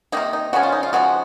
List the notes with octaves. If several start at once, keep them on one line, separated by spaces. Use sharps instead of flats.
C3 D#3 A#3 D#4
D#4
C#3 F3 G#3 C#4 F#4
F4
D#4
F4
C#3 F3 G#3 F#4